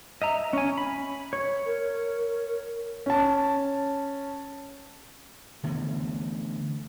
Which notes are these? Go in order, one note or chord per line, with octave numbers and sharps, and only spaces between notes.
D#5 E5 A#5
C#4 G#5
B5
C#5
A#4
C#4 A5
D3 E3 A3 B3